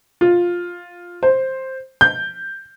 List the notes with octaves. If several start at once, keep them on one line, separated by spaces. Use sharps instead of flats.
F4
C5
G6